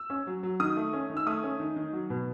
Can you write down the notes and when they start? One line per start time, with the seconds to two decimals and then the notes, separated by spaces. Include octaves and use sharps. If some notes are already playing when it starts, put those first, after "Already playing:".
Already playing: E6
0.10 C#4
0.27 F#3
0.43 F#3
0.60 D#3 D#6
0.77 A3
0.93 C#4
1.10 D#3
1.17 E6
1.26 A3 D#6
1.43 C#4
1.60 D#3
1.76 D#3
1.93 F#3
2.10 B2